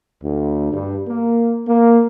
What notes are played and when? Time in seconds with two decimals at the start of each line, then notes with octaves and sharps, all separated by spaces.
0.23 D2
0.73 G2
1.08 A#3
1.67 A#3